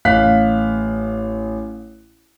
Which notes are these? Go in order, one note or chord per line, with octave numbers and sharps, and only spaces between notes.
A1 F5 F#6 B6